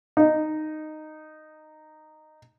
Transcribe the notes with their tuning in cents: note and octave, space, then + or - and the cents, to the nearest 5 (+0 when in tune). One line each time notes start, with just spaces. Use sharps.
D#4 -10